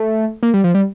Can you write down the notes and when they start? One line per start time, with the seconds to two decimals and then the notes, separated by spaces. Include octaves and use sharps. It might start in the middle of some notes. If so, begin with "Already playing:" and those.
Already playing: A3
0.43 A#3
0.54 G3
0.64 F3
0.75 G3